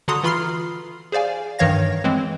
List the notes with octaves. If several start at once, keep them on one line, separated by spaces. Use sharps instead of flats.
D3 F#4 A4 A#5 C6 D#6
E3 F4 B5 C6 F6 C7
G#4 C5 D5 F5 G#5
G2 D#3 E3 C#5 F5 A#6
E3 G#3 C4